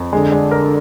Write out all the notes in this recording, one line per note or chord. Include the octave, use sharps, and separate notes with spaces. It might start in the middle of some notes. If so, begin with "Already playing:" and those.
Already playing: F2
D3 G#3
G#3
A#4